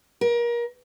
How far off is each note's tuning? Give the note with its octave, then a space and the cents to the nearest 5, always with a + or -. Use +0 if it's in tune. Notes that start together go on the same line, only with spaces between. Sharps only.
A#4 +30